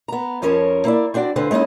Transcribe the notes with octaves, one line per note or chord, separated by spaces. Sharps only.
B3 A#5
F2 F3 C#4 A#4 C#5 A5
A#3 E4 D5
C4 D4 F#4 D5 G5
D2 D3 C4 F4 B4 C5
G#3 A#3 C#4 D#4 E4